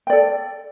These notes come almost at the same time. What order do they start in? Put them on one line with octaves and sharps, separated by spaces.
G5 D5 A4